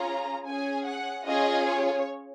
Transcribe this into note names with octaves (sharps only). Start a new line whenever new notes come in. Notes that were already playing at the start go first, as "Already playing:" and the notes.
Already playing: C#4 F4 G#4 A#5
C#4 G#4 G#5
F#5
C#4 F4 G#4 D#5
C#5